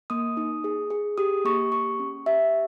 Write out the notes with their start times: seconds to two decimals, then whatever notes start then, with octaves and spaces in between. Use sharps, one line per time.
0.10 A#3 D#6
0.37 D#4
0.64 G#4
0.90 G#4
1.18 G4 D#6
1.45 A#3 C#6
1.72 G4 C#6
2.00 C#4
2.26 G4 E5